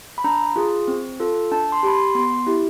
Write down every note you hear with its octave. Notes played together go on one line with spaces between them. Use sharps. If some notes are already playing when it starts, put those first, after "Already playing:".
B5
D4 A#5
F4 G#4
C4
F4 A4
D4 A5
C6
G4 B5
C6
B3 C6
E4 G4